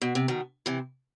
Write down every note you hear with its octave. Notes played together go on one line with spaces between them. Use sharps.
B2
C3
B2 D#3
C3 E3